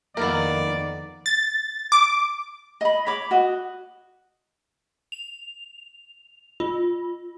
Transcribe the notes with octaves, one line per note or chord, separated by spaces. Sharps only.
F2 D#3 A#3 B3 E4 A#4 D5
A6
D6
D#5 B5
C#5 B5 D6
F#4 D#5
F7
F4